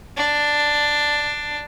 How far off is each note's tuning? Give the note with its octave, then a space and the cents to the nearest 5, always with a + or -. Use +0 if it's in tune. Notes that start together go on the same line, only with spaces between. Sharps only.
D4 +5